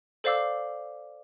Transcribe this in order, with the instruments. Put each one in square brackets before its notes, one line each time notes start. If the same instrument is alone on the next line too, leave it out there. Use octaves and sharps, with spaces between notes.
[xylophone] A4 C5 D5 F5 D6 E6